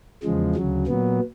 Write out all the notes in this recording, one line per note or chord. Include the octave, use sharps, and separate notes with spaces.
E2 C#3 F3 G#3
D2 C#3 F#3
A#2 F#3 B3